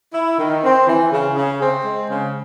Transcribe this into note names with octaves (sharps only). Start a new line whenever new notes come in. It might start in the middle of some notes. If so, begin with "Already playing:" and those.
E4
D#3
C4
E3
C#3
C#3
C4
G#3
C#3